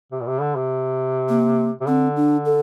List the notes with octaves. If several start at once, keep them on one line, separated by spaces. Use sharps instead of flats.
C3
A#2
C3
D3
C3
A#3
C3
D3 C4
D4
A4